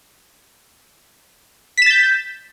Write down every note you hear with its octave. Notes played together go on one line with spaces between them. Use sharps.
G6 A6 B6 E7